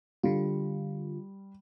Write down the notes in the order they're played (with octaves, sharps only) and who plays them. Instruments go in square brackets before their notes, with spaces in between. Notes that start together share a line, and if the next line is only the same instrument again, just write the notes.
[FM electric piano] D3 F4 [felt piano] G3